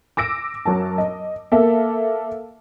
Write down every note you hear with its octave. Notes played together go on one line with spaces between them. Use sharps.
D6 E6 A#6 D7
F#2 F#3 A#4 A5
D#5
A#3 A4 E5